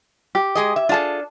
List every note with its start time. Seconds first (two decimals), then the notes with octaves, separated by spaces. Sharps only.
0.35 G4
0.55 G#3 G#4 D#5
0.76 E5
0.89 D4 F4 G#4 A4 A5